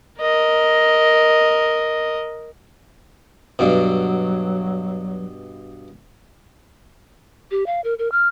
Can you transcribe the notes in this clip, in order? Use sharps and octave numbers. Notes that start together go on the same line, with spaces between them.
A#4 D#5
G2 B2 F#3
G4
F5
A#4
A#4
F6